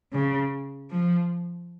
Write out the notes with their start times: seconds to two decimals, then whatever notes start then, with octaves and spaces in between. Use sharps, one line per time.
0.13 C#3
0.91 F3